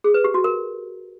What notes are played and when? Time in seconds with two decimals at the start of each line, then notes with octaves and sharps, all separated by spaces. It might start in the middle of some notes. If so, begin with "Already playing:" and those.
0.04 G#4
0.14 B4
0.24 G4
0.34 F#4
0.44 A#4